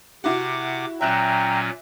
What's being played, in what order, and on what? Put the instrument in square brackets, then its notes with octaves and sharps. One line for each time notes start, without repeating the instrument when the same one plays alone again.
[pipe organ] C3 F#5 D6 [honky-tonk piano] E4 F#4
[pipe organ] A#2 F#3 C#4 [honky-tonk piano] E5 F#6 E7 [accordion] G5 A#5